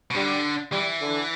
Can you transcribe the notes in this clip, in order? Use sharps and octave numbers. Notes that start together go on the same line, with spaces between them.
B2
D3 G3
E3 G3
D3